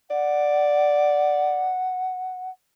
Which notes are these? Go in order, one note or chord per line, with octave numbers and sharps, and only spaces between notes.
D5 F#5